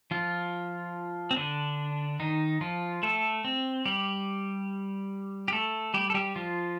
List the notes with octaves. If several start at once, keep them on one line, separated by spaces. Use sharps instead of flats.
F3 F4
C4
D3 D4
D#3 D#4
F3 F4
A3 A4
C4
G3 G4
G4
A3 A4
G3 G4
A4
G3 G4
F3 F4